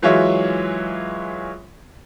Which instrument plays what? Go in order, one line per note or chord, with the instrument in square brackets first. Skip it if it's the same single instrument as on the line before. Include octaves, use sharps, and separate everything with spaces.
[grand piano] E3 F#3 G#3 F4 C#5 E5